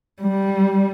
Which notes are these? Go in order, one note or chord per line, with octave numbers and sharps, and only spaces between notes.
G3